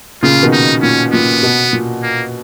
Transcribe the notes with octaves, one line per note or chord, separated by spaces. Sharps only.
A#2 C#3 F4
B2 D#3
D#4
A#2 C#4
A#2 B3
B2
A#2
A#3